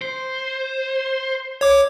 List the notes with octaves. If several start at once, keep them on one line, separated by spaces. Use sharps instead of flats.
C5
C#5 D6